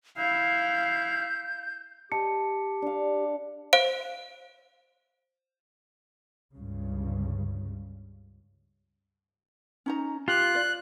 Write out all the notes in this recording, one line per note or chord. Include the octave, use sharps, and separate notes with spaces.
E4 F5 G6
G4 D#5 A5 C#7
D4 F5
C5 F5 D7
C#2 G2 C#3
C#4 D#4 A#5
F4 G4 F#6
D5